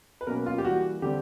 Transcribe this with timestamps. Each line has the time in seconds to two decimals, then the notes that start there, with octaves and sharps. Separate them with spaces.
0.21 B4
0.27 B2 F#3 A#3 C#4 A#4
0.46 F4
0.58 G4
0.65 E3 G3 A#3 F#4
1.02 D3 G3 C4 G4